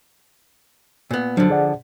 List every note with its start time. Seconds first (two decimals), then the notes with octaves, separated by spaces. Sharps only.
1.11 A#2 B3
1.37 D3 F3 F#3 D4
1.50 G#4 D5 F#5